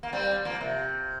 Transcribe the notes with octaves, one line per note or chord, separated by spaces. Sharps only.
A#3
G3 C4
F3 A#3
C3